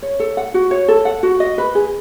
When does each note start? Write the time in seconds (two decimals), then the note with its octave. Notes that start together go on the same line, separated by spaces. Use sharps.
0.02 C#5
0.20 A4
0.37 F#5
0.54 F#4
0.71 C#5
0.88 A4
1.05 F#5
1.23 F#4
1.40 D#5
1.58 B4
1.75 G#4